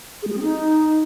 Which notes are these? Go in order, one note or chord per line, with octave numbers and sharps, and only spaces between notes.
G#4
G#3
G#4
C4
D#4